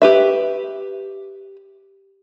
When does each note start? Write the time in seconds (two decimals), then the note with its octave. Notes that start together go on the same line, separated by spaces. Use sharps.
0.02 G4 B4 E5